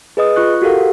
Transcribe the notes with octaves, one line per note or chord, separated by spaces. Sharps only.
G#4 B4 D#5 D#6
F4 C#6 F#6
F#4 G4 A4 A#4 F5 F#5